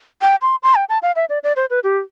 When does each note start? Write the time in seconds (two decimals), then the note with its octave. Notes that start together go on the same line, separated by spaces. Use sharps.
0.22 G5
0.42 C6
0.63 C6
0.75 G5
0.89 A5
1.02 F5
1.16 E5
1.29 D5
1.43 D5
1.56 C5
1.70 B4
1.84 G4